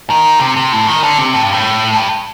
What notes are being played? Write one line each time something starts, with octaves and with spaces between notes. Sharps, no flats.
D#3
C3
C3
A2
D#3
D3
C3
A2
G2
A2
G2